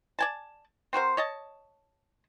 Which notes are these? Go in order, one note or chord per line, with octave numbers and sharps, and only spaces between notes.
D5 G#5 A5
C4 F#4 A#4 C5
C#5 D#5 A5